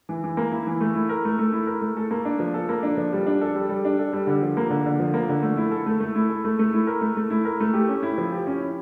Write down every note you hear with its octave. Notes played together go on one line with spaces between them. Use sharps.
E3
E3
A#3
E4
E3
A3
E4
A#4
A3
A3
E4
A#4
A3
A4
A#3
D4
F3
A4
A#3
D4
F3
G3
D4
A4
G3
G3
D4
A4
G3
D3
F3
A#3
D3
D3
F3
A#3
D3
A3
E4
A4
A3
A3
E4
A4
A3
A3
E4
A#4
A3
A3
E4
A#4
A3
G4
C#4
E4
F3
G4
C#4
E4